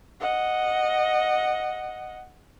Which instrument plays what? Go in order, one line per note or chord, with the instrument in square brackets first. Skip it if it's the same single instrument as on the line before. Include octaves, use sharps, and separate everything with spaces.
[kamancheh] D#5 F#5